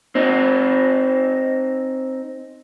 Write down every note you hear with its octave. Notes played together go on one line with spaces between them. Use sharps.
C4 D#4